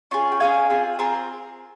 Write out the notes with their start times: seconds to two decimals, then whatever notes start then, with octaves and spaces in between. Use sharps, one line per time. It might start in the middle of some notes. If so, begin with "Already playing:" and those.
0.11 C#4 F4 G#4
0.32 G5
0.40 C#4 F4 G#4 F5 G#5
0.70 C4 F4 G#4
0.99 C4 F4 G#4 A#4